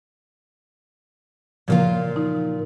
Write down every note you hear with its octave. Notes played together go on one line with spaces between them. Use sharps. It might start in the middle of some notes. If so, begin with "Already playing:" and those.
A#2 C#3 E3 F3 A#3 F4
D#4